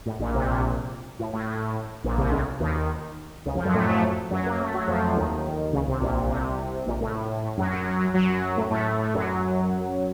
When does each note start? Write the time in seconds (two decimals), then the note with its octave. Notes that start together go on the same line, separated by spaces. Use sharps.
0.06 A2
0.19 A#1 A#2
0.34 C2 C3
0.48 A#1 A#2
1.19 A2
1.33 A2
1.47 A2
2.04 A#1 A#2
2.18 C2 C3
2.32 C#2 C#3
2.60 D#2 D#3
3.45 C#2 C#3
3.55 F2 F3
3.65 F#2 F#3
3.74 A2 A3
3.89 A2 A3
4.31 F#2 F#3
4.46 A#3
4.61 A3
4.74 F#3
4.88 F2 F3
5.16 D#2 D#3
5.73 C#2 C#3
5.87 C2 C3
6.01 A#1 A#2
6.29 C2 C3
6.87 A#1 A#2
7.01 A2
7.44 A2
7.58 F#2 F#3
7.71 F#2 F#3
7.86 F#2 F#3
8.00 F#2 F#3
8.14 F#2 F#3
8.57 A2 A3
8.71 A2 A3
8.99 A2 A3
9.14 F#2 F#3